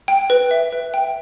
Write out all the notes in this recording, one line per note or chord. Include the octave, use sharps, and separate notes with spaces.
G5
B4
E5
B4
G5